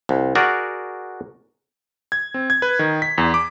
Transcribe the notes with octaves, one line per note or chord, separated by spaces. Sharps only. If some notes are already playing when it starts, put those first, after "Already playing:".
C2
F#4 G#4 A#4 D5 F#5
G#6
C4
G#6
B4
D#3
B6
E2
D6